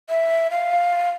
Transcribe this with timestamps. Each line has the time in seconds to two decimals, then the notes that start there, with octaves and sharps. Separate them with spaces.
0.09 E5
0.51 F5